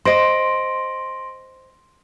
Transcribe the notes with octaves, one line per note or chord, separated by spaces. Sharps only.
C5 D#5 C6 A#6 D7